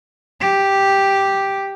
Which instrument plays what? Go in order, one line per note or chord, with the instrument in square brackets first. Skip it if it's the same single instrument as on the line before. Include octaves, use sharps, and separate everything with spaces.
[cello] G4